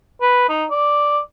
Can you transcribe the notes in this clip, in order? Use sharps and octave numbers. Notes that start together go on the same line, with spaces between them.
B4
D#4
D5